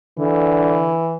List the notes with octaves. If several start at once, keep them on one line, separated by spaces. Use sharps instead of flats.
D3 E3